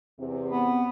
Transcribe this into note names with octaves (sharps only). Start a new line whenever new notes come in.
E2 C3 C4
B3